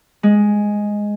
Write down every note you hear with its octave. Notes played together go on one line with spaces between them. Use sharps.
G#3